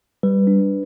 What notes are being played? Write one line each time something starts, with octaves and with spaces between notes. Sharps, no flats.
G3 B4
D4